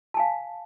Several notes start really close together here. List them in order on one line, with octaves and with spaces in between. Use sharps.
A5 G#5 F5